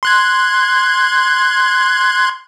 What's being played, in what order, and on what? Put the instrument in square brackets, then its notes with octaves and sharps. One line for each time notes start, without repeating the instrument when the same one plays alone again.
[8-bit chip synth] C6 F#6 G#6